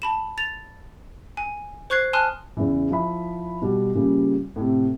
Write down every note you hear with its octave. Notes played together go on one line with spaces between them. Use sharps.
A5 B5 E7
A6 F7
G#5
C5 C#6 F#6 G#6 C7
G#5 A5 C6 D#6 F6 F#6
E2 C#3 E3
F3 E4 B5
B2 G3 F#4
A#2 C#3 G3
A2 C3